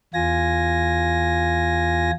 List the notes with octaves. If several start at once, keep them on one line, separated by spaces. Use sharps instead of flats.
E2 F4 G#5 A#6